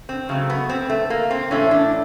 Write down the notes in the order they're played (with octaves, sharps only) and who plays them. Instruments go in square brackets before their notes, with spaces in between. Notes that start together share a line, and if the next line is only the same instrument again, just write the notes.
[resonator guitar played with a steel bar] C4
C#3 F#3 A3
B3
C4
A3
A#3
C4
A2 E3 A3 C#4
D4